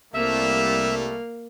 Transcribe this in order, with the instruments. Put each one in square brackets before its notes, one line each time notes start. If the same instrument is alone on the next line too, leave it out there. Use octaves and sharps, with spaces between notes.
[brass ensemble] C2 [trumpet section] G3 A3 [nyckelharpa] A#3 F5 [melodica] E5